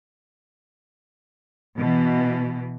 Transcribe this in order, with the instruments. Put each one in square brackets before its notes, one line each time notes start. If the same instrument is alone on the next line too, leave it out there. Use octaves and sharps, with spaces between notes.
[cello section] B2 E3